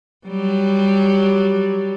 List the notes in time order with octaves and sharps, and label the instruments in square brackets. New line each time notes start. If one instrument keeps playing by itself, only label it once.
[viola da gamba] F#3 G3